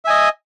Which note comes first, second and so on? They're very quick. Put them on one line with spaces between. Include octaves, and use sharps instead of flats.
E5 G#5 D#5